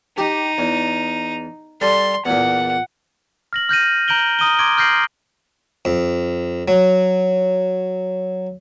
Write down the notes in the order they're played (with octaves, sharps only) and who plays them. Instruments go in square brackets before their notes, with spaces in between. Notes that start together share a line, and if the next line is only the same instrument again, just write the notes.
[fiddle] D#4 [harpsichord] G4
[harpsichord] E2
[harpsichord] G3 A4 A5 [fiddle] C6
[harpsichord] E2 A#2 [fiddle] F#5
[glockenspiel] F6 A#6 F#7
F6 G6 A#6 D#7
A#5 G6 D7 F#7 G7
A#5 D#6 D#7 G7
C6 D6 G#6 D7 G7
F6 G6 A#6 C7 D7 F#7
[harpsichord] F2
F#3